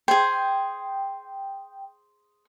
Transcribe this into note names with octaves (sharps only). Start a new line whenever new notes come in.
G#4 C5 G5